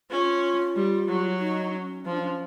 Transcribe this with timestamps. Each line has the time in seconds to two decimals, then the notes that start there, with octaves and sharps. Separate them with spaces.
0.10 C#4 F4
0.76 G3
1.07 F#3
1.39 D#4
1.73 C#4
2.05 F3 C#4
2.12 D4
2.19 C#4